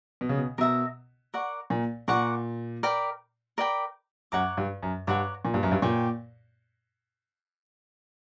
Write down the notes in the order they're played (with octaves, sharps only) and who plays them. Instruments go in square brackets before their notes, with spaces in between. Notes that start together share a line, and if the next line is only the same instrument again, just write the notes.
[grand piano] B2
C#3
B2
[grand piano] B2 [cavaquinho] A#4 E5 A#5
[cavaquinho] A#4 D5 F#5 C#6
[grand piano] A#2
[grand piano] A#2 [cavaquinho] A#4 D5 F#5 C#6
[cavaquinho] A#4 D5 G5 B5
A#4 D5 G5 B5
[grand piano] F#2 [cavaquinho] C#5 F#5 A#5 D6
[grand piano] G2
F#2
[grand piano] G2 [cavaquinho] C#5 F#5 A#5 D6
[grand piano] A#2
G2
F#2
G2
[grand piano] A#2 [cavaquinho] G4 C#5 G5